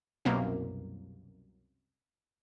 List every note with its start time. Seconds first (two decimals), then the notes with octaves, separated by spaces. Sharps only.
0.25 C2 F#2 B2 A#3